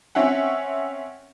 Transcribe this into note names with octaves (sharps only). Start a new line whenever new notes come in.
C4 C#4 E5 F#5